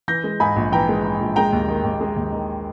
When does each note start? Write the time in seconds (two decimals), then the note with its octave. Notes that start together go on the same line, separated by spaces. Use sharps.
0.08 E3 G6 A#6
0.24 G#3
0.40 G#2 G#5 B5
0.56 A#1
0.72 E3 G5 A#5
0.89 G#3
1.04 G#2
1.21 A#1
1.36 G#3 G5 A#5
1.53 D#2
1.68 D#3
1.84 D#2
2.01 G#3
2.17 D#2
2.32 D#3